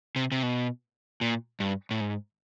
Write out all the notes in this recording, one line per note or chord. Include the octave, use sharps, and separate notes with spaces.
C3
C3
B2
A#2
G2
A2
G#2